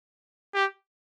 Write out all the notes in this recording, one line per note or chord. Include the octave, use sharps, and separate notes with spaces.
G4